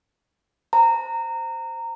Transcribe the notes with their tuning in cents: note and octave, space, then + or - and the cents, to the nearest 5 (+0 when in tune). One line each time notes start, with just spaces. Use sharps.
C5 +0 A#5 -20